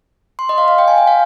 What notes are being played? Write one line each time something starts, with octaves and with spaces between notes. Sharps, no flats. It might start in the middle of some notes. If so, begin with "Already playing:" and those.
C6
D#5
F5
F5
G5
G#5
G5
F5